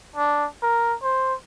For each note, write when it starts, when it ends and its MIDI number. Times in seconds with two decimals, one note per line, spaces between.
0.16 0.46 62
0.63 0.95 70
1.02 1.34 72